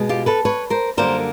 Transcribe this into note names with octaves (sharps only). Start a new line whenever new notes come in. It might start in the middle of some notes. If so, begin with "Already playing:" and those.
Already playing: B2 G#3
F4 G4
A4 B4
B4 C#5
A#4 C5
F#2 D3 G3 A#3 A#4 C5